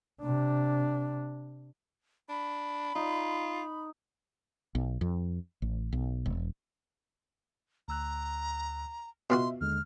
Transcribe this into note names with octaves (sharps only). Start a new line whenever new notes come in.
C3 D4
D4 B5
D#4 F4
B1
F2
A1
B1
E1
D2 A#5 E6 F#6
B2 F4 F#4 D#5 E5 C6
D#2 D3 G#3 F6